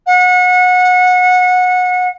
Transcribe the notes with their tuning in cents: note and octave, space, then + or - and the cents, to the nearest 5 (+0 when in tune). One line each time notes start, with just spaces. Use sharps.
F#5 -25